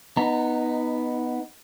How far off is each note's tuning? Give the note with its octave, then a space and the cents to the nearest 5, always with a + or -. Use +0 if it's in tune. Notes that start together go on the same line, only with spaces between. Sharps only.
B3 +0 D#4 +0 A#5 -25